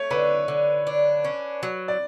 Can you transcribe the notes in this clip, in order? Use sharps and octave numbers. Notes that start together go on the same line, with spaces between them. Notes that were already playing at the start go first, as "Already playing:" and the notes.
Already playing: A3 C#5
D3 B4
D3
D4
C#4
F#3
D5